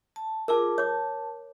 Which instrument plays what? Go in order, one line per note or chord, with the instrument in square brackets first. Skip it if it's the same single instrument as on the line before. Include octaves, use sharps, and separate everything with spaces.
[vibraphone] A5
[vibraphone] F4 G#4 D6 [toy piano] A#4 A5
[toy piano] C#5 D6 [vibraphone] A5